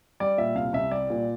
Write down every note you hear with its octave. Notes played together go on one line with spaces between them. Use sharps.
G3 D5
A#2 E5
C2 F5
C2 E5
G3 D5
A#2